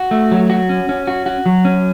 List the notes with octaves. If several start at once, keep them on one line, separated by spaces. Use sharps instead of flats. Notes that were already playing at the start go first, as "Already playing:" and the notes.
Already playing: F#4
A3
F#3
F#4
C#4
C#4
F#4
F#4
F#3
C#4